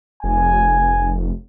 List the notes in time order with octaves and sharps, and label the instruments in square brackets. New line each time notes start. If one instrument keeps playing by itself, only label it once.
[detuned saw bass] F1 [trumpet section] G#5